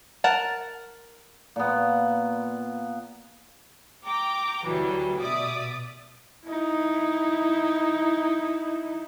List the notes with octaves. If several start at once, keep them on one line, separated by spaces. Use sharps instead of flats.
A#4 F#5 A5
A#2 B3
G5 A#5 D6
D2 E3 F#3 G3
B2 D5 E5 D#6
D#4 E4